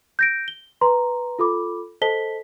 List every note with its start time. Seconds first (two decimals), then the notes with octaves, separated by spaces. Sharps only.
0.19 G6 A#6 D7
0.48 G7
0.81 B4 A#5 C6
1.39 F4 A4 B5 D6
2.01 A4 C5 D#5 A5 B6 G7